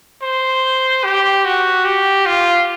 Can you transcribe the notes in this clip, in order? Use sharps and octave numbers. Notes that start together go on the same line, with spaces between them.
C5
G4
F#4
G4
F4